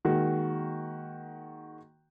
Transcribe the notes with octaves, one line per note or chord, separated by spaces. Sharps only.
D#3 G#3 A#3 F#4